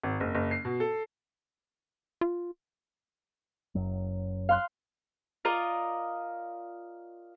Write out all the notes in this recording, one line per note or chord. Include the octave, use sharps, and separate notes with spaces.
G#1
F#1
F#1
C7
B2
A4
F4
F#1 F#2 F#3
F5 C6 F#6
F4 A#4 D5 D#5